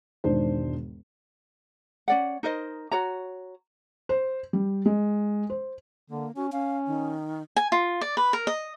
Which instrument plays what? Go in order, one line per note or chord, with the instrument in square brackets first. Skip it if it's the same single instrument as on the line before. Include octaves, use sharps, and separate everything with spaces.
[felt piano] E1 G#2 D#3 D4 C5
[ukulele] C#4 D5 F#5
D#4 A#4 C5 D#5
F#4 C#5 A#5
[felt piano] C5
G3
G#3
C5
[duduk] D3 [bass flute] A#3
[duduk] C#4 [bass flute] F#4
[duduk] C#4 [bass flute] F5
[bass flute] D#3
[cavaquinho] G#5
F4
D5
B4
A#4
D#5